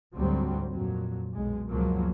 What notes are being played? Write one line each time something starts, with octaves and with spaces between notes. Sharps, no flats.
D2 G#2 F#3 G3 C4
F2 A#2 F#3
B1 G#3
C#2 F#2 B2 F3 F#3 A#3